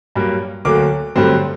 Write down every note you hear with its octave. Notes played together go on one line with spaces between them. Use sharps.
G2 F#3 A#3
D2 D3 F#3 A#3 D6
G2 D3 F#3 A3 C4